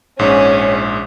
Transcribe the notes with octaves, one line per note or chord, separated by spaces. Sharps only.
A#1 G#2 C#4 C#5